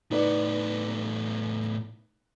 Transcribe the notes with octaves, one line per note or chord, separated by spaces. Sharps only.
A2 B3 D#4 B4 D5